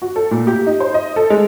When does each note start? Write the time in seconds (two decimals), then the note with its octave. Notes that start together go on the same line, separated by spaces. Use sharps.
0.02 F#4
0.16 A4
0.31 A#2
0.47 G4
0.67 D#4
0.80 C5
0.94 D#5
1.16 A4
1.30 G#3